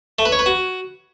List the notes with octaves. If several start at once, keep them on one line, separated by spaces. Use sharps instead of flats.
A3
B4
C#5
B4
F#4